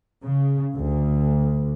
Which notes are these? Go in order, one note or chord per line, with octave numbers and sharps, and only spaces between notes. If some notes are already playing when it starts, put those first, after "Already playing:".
C#3
D2